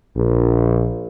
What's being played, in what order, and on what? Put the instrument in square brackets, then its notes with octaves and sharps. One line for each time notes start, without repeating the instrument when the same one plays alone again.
[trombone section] A#1